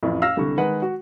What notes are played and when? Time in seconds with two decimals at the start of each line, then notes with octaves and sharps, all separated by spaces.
0.03 A1 F2 A2
0.22 F5 E6 F6 A#6 E7
0.37 C2 D3 G3 C#6
0.57 D#3 G#3 B4 F#5
0.82 F#4